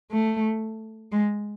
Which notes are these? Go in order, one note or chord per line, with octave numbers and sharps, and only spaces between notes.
A3
G#3